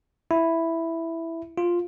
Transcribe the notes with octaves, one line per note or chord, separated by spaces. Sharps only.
E4
F4